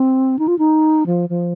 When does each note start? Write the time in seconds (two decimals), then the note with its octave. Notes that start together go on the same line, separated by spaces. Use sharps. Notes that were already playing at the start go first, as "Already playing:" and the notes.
Already playing: C4
0.39 D#4
0.48 F4
0.59 D#4
1.06 F3
1.29 F3